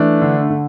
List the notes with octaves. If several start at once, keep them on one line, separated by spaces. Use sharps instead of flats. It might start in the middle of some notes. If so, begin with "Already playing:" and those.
Already playing: E3 A3 D4
D3
D3